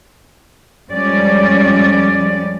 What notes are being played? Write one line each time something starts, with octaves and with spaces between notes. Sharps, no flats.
F2 F3 G3 G#3 C#4 D5